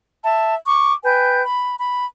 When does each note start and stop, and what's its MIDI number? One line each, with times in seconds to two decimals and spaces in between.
0.24 0.55 76
0.24 0.55 81
0.67 0.93 85
0.67 0.93 86
1.03 1.43 71
1.03 1.43 79
1.03 1.43 80
1.03 1.43 91
1.45 1.75 83
1.79 2.05 83